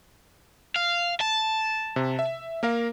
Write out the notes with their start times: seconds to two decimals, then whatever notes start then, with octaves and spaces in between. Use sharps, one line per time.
0.76 F5
1.21 A5
1.96 C3
2.19 E5
2.63 A#3 A#4 F5